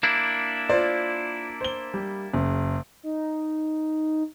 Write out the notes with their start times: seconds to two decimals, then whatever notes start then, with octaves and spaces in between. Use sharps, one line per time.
0.03 A#3 D4 E4
0.70 F4 C5 D5
1.61 C5 G7
1.94 G3
2.33 F#1 C#3
3.03 D#4